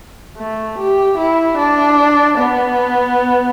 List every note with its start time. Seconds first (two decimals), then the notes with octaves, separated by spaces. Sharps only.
0.38 A3
0.78 G4
1.18 E4
1.58 D4
2.38 B3